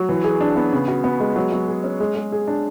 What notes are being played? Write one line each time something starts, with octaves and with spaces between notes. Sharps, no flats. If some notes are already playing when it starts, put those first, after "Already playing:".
Already playing: F#3
E3
G#4
D4
B3
C#3
F#4
B3
G#3
F#3
F#3
G#4
C#4
G#3
G#3
G#4
D4